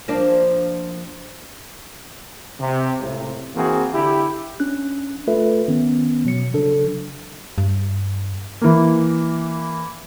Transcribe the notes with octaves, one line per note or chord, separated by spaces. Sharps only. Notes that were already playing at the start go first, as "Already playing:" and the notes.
F3 A#3 D4
C3
C#2 A2 C3
E3 A#3 C4 F#4 G#4
D3 E4 G4
C#4 D4 F#6
A3 F4 A4 B4 E5
D#3 B3 C#4
B2 F#3 C#7
C#3 F#3 D4 A4
G2
E3 A#3